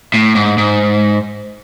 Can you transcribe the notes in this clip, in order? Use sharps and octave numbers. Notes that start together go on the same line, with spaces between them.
A2
G#2
G#2